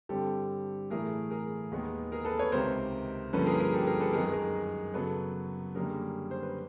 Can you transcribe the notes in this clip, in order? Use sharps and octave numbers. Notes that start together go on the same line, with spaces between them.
G2 D3 G3 C4 G4 A4
A2 E3 A3 G#4 A#4
G#4 A#4
D#2 D#3 G#3 B3
G#4 A#4
A4 B4
B4 C#5
C#2 C3 D#3 A#4 C5
G2 D3 F3 A#3 C#4 A4 B4
G#4 A#4
G#4 A#4
G4 A4
G#4 A#4
A4 B4
F#2 D#3 G#3 G#4 A#4
G#4 A#4
F#2 C#3 F#3 B3 A4 B4
F#2 D3 G3 A#3 C#4 G#4 A#4
C5
B4